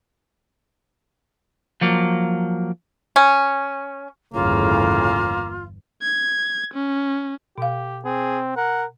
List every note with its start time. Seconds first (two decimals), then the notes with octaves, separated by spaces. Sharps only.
1.81 F3 F#3 A#3
3.16 C#4
4.34 G1 E2 A2 C#3 A#3 F4
6.02 G#6
6.74 C#4
7.58 B2 G4 F5
8.04 C4 G#4
8.56 A#4 F#5